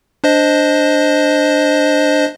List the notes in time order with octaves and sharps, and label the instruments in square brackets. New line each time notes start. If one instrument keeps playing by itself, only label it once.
[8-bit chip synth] D4 C5 D#5